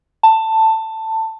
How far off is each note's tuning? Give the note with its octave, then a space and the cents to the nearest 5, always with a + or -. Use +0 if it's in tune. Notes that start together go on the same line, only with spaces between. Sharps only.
A5 +15